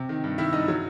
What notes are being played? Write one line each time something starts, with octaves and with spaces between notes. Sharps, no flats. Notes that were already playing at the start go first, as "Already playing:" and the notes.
Already playing: C3
D#3
G2
D#3 E4 E5
G2 D#4 D#5
F#3